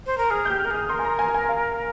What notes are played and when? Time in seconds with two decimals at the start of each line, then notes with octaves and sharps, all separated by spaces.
0.06 C5
0.18 A#4
0.30 G#4 F6
0.45 G4 G6
0.59 F6
0.65 A#4
0.70 G#4 D#6
0.89 A#4 C6
0.99 G#5
1.04 A#5
1.19 G#5
1.34 G#5
1.49 F5